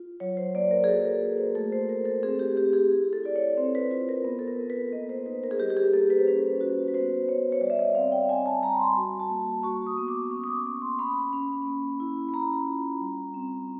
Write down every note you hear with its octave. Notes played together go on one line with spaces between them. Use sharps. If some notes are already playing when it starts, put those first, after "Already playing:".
Already playing: F4
F#3 C#5
C5
A#3 D5
A#4
G#4
F#4 A4
A#4
A#3 B4
C5
A3 A4
C5
A3 A#4
A4
C4 G#4
G4
C4 G4
G#4
E4
A4
E4 D5
C#5
C4 C5
B4
F4 B4
A#4
B3
A4
A#4
B3
B4
A#3 D#5
C5
D#4 B4
A#4
G#4
G3 G4
G4
G#4
A#3 A4
B4
C5
C#4 B4
F#4
B4
B3 C5
B3 C#5
C#5
G3 D5
E5
D#5
C4 F5
G5
C4 G#5
A5
G3 A#5
B5
C6
F#4
A5
A#3
F#4 C#6
D#6
B3
D6
C#4 C#6
D#6
D6
A#3 C#6
C6
C#4 B5
C#4
A#3
E4
B5
C#4 A#5
F4
G3
C4